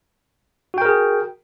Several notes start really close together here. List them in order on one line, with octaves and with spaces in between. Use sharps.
F#4 G5 A#4 G#4